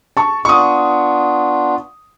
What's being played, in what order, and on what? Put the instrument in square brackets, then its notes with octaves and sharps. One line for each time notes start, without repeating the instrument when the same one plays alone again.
[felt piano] A5 C#6
[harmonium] B3 D4 F4 [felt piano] C#6 D#6